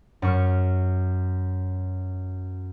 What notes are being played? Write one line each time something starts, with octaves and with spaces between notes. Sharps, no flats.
F#2 C#6 F6